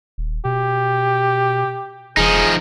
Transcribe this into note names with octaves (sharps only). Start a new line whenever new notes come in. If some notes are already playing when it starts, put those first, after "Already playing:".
D#1
B2 G4
E1 F3 D#4 G#4